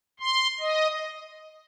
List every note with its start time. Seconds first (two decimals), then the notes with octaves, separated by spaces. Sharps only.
0.20 C6
0.60 D#5